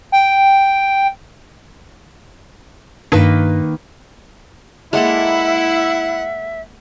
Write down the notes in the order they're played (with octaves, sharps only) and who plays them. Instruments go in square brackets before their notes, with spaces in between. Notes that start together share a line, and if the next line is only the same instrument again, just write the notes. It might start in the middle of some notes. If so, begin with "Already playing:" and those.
[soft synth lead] G5
[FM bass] G2 [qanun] D#3 A#3 B4
[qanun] G#3 A#3 A4 [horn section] E4 [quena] E5 [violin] F#5